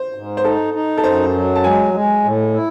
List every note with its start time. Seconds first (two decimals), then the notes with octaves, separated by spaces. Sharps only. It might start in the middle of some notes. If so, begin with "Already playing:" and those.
Already playing: C5
0.14 G#2
0.37 C5
0.44 D#4 A4
0.74 D#4
0.98 A4
1.04 F#2 C5
1.34 F#3
1.56 A5
1.64 G#3 G#5
1.94 G#3
2.24 A2
2.54 E4